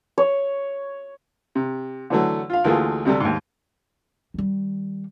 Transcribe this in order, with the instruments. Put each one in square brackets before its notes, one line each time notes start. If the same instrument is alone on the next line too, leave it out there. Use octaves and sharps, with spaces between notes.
[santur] C#5
[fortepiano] C3
D3 E3 F#3 A3
F4 F5
D2 E3 A3 A#3 F4 G#4
D2 C3 G3 A3
D#2 G#2
[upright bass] D#3 G3